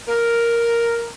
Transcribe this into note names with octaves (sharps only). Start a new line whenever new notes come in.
A#4